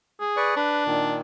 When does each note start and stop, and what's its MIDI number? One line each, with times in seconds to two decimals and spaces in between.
0.20 0.53 68
0.37 0.55 71
0.37 0.55 74
0.37 0.55 85
0.56 1.17 62
0.56 0.83 71
0.86 1.21 46
0.86 1.21 51